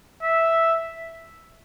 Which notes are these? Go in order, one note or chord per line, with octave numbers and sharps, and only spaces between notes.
E5